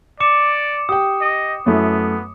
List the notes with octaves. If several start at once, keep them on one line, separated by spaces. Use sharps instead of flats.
D5 D6 C#7 E7
G4 G5 D#6
D#5
F#2 A3 B3 E4